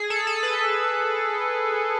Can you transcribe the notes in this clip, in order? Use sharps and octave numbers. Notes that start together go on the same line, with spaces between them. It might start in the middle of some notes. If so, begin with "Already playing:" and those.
Already playing: G#4
A4
A4
B4